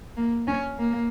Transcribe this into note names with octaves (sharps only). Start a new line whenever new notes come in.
A#3
C#4
A#3